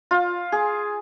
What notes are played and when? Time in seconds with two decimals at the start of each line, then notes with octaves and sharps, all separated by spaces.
0.11 F4
0.52 G#4